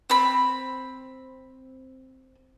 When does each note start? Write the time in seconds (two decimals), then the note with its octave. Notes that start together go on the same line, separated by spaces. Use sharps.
0.10 C4 B5